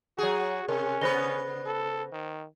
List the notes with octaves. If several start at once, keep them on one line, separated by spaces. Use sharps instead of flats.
F#3 F#4 G#4
C3 C#4 A#4 G#5
C#3 B3 B4 C5 A#6 G7
A4
D#3